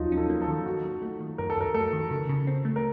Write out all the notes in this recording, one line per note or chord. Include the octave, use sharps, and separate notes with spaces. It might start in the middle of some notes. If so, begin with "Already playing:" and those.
Already playing: D#2 F3 F#3 A#3 D#4 F4
C#4
A4
A#3
A4
D#3
F#2 F#4
F#2
A3
D#3
F#2 A#4
A4
F#2 A#4
A3 A4
D#3
C#3
C#3
C4
A3
A#4